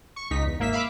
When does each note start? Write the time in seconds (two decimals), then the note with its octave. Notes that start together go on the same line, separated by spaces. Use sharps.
0.16 C#6
0.31 C#2 D#4 B6
0.45 E2
0.59 G#1 A#3 E5 B6
0.73 E5 F5 B5 D6